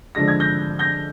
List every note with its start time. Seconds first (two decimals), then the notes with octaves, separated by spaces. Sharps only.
0.15 D3 F3 G#3 D4 A#6
0.28 G#6
0.40 G6 A#6
0.79 G6 A#6